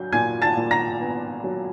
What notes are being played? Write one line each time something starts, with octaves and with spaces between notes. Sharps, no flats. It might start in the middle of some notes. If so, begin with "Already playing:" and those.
Already playing: F#3 G6
A#2 G#5 G#6
A5 A6
A#2
A#5 A#6
B3
F#3